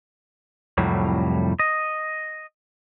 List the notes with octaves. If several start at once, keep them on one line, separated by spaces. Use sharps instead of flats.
C2 F2 A2 F#3 G3
D#5